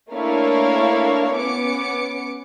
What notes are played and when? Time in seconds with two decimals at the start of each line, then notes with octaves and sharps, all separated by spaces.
0.11 A3 A#3 D4 E4 C#5 F5
1.35 B3 C#4 D6 C#7